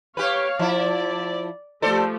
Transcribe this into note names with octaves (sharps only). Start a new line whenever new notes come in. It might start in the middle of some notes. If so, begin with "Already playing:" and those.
G4 B4 C#5 F5
F3 E4 D5
F3 A3 G4 A4 C5 D5